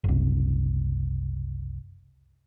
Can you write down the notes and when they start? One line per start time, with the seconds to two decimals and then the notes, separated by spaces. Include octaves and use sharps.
0.04 F#1 C2